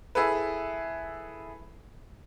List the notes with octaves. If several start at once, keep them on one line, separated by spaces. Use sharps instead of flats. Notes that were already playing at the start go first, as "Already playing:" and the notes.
E4 G#4 A4 B4